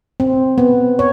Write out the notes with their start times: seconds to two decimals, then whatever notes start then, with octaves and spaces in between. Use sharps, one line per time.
0.20 C4
0.58 B3
0.99 C#5